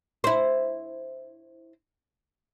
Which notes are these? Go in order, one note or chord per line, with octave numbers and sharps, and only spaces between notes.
E4 C5